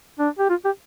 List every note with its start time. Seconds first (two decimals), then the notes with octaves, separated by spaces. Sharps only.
0.19 D4
0.39 G4
0.50 F4
0.65 G4